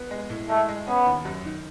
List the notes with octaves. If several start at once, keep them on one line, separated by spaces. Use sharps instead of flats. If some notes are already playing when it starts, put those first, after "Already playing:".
Already playing: B3
G#3
A2
G#3 A3
G#3
B3 C#4
D#2
F#2
D#3